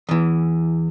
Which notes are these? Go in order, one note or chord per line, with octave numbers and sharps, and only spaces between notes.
E2 E3